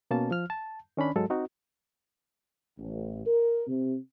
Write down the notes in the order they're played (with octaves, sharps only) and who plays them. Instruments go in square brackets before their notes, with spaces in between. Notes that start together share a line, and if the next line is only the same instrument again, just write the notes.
[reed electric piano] B2 A#3 C#4 A5
F3 F6
A5
D#3 C#4 D4 B5
G#2 F#3 G#3 A4
C4 D#4 F#4
[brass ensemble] A1
A#4
C3